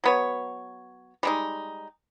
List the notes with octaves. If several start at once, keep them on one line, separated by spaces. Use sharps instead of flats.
F#3 B3 C#5
G3 G#3 D#4